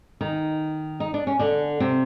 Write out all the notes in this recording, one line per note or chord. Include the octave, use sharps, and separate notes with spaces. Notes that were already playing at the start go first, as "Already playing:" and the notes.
D#3 D#4
D#4
D4
C#4
D3 D4
C3 C4